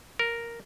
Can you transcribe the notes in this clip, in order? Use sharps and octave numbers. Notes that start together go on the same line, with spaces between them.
A#4